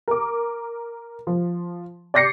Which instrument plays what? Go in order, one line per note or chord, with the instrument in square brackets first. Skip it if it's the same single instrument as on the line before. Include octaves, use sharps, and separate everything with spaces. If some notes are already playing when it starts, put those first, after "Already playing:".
[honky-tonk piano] A#4 D6
F3
D5 D6 G6 A#6 C7 C#7